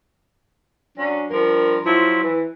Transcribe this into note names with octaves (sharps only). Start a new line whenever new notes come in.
F#3 C#4 D4
G2 F3 A#4
F3 F#3 E4 F4
E3